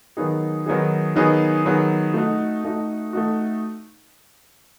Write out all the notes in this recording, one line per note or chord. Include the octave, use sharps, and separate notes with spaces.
D#3 F#3 B3 D#4 G#4
D#3 F#3 B3 D#4 G#4
D#3 F#3 B3 D#4 G#4
D#3 F#3 B3 D#4 G#4
A3 D#4 F#4
A3 D#4 F#4
A3 D#4 F#4